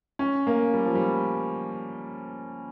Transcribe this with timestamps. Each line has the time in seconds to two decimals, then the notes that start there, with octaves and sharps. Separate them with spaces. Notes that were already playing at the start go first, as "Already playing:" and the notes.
0.19 C#4
0.47 A#3
0.74 G3
0.85 F3
0.95 G3